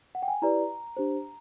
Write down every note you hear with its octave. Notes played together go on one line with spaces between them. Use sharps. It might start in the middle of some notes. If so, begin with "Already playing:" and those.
F#5
G5
G#5
E4 G4 B4 D5 A#5
D4 G4 C5